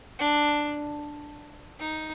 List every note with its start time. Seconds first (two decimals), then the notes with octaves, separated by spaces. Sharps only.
0.19 D4
1.79 D#4